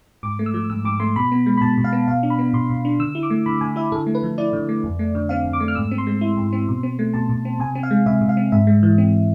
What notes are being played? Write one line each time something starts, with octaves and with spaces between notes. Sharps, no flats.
G#2 D6
A3
E6
F3
G#2 E6
G#2 D6
A3 C6
B2 B5
B3
G#3
B5
B2 A5
B2
F5
B3
B2 F5
D4
B5
B3
B2 C6
B2
D4
D3 E6
E4
D6
A3
D3 B5
D3 G#5
E4 E5
D3 A4
A3
B4
F3
E4 D5
D3
A3
F2
A3
D3
C4 F5
F2
D6
A3
F6
G#2 E6
C4
C6
G#3
E4
G#2
C4
B2
C4
A3
B2 A5
B2
C4
C3 G#5
C4
F5
G#3
C3 E5
C3
F5
C4
G#2 E5
G#3
E3
C4